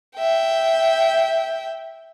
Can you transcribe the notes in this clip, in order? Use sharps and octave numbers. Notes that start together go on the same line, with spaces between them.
E5 G5